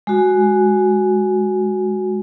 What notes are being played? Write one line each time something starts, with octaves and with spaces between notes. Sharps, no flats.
G#3 F#4